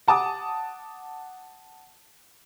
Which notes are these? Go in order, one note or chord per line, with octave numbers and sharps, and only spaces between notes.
F#5 A5 D6 D#6